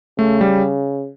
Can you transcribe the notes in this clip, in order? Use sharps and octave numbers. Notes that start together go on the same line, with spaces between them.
C#3 A3
G3